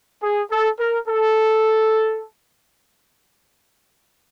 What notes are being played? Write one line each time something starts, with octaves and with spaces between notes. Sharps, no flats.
G#4
A4
A#4
A4